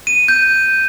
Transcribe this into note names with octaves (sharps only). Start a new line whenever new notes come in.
D#7
G6